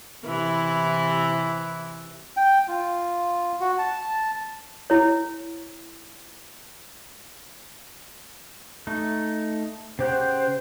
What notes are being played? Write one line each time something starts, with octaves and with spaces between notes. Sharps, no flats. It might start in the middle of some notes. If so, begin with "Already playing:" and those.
C3 E3 E4
G5
F4
F#4
A5
E4 C#5
A3 D#4
C#3 G4 C5 F#5